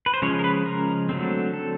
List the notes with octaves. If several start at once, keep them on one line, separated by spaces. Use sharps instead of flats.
B4
C5
C#3 F3 G#3 C#4 C#5
A#4
B4
A#4
D3 F#3 A3 C4
A4